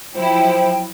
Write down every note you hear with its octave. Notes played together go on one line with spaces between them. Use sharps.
F3 F#3 E4 C5 G5